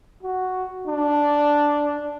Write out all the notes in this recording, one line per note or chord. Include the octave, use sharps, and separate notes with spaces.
F#4
D4